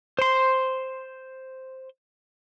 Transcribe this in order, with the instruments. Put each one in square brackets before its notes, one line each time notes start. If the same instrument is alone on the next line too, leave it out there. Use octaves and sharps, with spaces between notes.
[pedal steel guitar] C5 C6